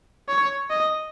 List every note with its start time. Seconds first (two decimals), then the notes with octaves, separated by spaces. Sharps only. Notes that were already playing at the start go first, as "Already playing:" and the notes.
0.28 C#5
0.70 D#5